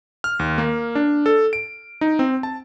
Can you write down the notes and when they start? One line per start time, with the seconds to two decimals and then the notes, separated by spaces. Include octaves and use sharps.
0.24 F6
0.39 D#2
0.58 A#3
0.95 D4
1.26 A4
1.53 D7
2.01 D#4
2.19 C4
2.43 A5